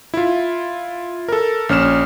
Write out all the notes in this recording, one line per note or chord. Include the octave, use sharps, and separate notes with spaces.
E4 F4
A4 A#4
A#1 C#4 F6 E7